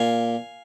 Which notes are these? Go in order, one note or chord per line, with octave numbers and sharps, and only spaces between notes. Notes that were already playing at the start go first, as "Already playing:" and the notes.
Already playing: A#2 F5 G#5